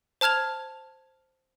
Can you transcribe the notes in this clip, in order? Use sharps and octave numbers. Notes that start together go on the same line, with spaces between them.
C5 A5 F6 G#6 F7